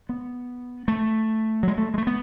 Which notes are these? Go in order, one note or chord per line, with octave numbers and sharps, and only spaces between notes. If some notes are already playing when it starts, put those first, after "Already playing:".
B3
A3
F#3
G#3
A3
G#3
A3
B3